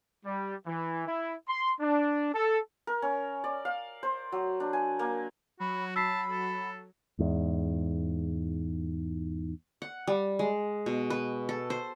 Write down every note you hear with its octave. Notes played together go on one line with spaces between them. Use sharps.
G3
E3
E4
C6
D4
A4
A#4
C#4
D5
F5
C5
F#3
D4
G#5
A#3
F#3 F#4 B5
A5 B5 E6 B6 C7
A4
E2 G#2
F#5
G3
G#3
B2
B4
A4
C5